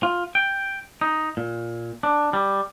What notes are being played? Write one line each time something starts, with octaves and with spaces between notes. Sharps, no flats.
F4
G5
D#4
A#2
D4
G3